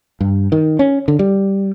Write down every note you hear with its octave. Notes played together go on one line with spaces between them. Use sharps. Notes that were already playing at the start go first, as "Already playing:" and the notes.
G2
D#3
C#4
D3
G3